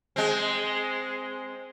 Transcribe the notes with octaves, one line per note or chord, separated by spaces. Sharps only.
G#3 C4